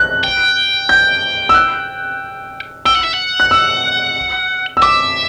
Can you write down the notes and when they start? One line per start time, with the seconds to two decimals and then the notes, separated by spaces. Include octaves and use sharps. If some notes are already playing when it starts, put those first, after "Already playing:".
Already playing: F#6
0.24 G5
0.89 G6
1.49 E6
1.54 F#6
2.85 G5 E6
2.95 F#5
3.04 E5
3.14 F#5
3.40 F#6
3.51 E6
4.77 E6
4.82 E5 D6